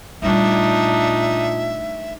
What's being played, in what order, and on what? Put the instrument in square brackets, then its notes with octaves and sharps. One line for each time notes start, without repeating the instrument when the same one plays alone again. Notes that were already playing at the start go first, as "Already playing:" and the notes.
[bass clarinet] A#2 [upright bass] G3 A3 [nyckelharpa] D4 D#4 [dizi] E5